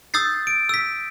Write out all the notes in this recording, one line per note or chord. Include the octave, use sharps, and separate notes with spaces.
D#6 E6 G6 A6 C7
D7
E6 B6